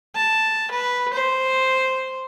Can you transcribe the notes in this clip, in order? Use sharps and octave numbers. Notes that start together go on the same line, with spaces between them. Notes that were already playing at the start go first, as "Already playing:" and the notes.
A5
B4
C5